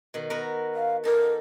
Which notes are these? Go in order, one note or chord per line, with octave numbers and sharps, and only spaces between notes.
B2 D#3
B3 F#4 A#4
F5
D#4 A4 A#4